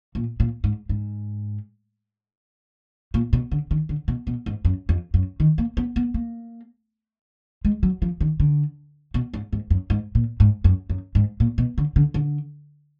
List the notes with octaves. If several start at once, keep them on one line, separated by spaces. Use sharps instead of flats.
A#2
A#2
G#2
G#2
A#2
B2
D3
D#3
D3
B2
B2
G#2
F#2
F2
F#2
D#3
A#3
B3
B3
A#3
G#3
F#3
F3
D#3
D3
B2
G#2
G#2
F#2
G#2
A#2
G#2
F#2
F#2
G#2
A#2
B2
D3
D3
D3